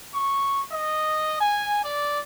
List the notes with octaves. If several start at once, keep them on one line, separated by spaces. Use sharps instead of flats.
C#6
D#5
G#5
D5